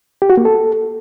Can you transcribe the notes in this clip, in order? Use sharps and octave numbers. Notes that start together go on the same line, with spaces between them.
G4
F#4
A#3
A4